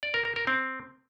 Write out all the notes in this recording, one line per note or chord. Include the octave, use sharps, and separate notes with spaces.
D5
A#4
A#4
A#4
C4